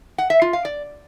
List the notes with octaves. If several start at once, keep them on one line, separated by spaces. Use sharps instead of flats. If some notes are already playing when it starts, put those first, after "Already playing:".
F#5
E5
F4
F5
D5